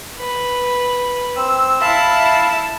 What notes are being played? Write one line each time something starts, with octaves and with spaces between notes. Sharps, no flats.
B4
C4 E6
E4 E5 F5 A5 B5